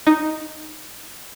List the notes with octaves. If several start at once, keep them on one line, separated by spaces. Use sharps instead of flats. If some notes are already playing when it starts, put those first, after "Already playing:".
D#4